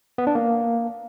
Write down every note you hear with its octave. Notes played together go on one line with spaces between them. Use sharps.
B3
D4
A#3